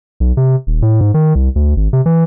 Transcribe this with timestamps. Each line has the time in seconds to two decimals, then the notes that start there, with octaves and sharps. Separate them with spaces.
0.20 B1
0.37 C3
0.67 D#1
0.82 A2
1.01 G#2
1.14 D#3
1.35 C2
1.56 D2
1.77 G#1
1.93 C3
2.06 E3